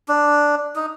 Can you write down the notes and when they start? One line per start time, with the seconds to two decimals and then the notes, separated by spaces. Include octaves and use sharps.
0.08 D4
0.76 D#4